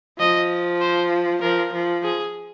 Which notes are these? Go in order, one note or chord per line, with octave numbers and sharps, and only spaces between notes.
F3 D#5
C5
F3 A#4
F3
G#4